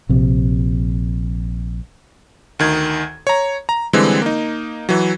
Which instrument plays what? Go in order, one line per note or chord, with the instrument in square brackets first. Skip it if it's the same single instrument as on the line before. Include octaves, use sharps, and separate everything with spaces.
[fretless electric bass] A#1 C3
[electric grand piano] D2 D#3 G#6
C#5 A#5
A#5
D3 E3 G3 G#3 C4
A#3 D#4
E3 F#3